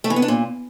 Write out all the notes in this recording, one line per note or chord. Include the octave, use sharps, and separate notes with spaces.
A3
E3
B3
D4
A#2